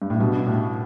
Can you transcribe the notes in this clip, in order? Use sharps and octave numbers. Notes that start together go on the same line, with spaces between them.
G2
A2
G2 B2
A2